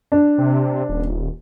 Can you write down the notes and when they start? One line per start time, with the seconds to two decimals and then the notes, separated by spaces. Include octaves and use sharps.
0.12 D4
0.38 C3
0.89 D#1